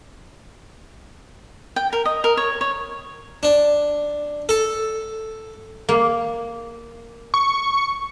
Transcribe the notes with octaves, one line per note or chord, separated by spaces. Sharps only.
G5
A#4
D#5
A#4
C#5
C#5
D4
A4
A#3
C#6